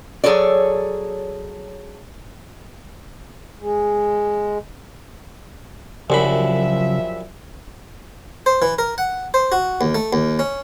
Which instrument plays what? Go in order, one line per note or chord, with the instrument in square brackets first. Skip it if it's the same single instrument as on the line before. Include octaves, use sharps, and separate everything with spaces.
[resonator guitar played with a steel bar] F#3 G#4 A4 C#5 D5
[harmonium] G#3
[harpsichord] C2 F#2 B5 [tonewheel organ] C#3 F#3 [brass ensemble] F3 E5
[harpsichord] C5
E3
A#4
F#5
C5
F#4
D#2
A3
D#2
C#4